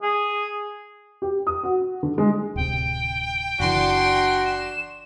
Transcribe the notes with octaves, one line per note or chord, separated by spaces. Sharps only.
G#4
G4
D#6
F#4
D3
G#3
D1 C3 G5
F#1 E3 D4 F#4 C6
E7